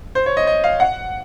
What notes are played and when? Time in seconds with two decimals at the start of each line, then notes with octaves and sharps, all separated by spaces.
0.15 C5
0.26 C#5
0.37 D#5
0.47 D#5
0.64 F5
0.80 F#5